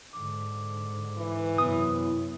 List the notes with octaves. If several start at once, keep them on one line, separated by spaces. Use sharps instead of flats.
G#2 D3 D6
E3
F#2 C3 B3 E4 D#6